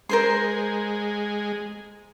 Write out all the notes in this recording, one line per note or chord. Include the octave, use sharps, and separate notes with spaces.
G#3 A#4 C5 C6